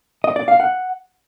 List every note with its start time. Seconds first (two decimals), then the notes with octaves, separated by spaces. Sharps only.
0.24 D#5
0.36 D5
0.48 F5
0.60 F#5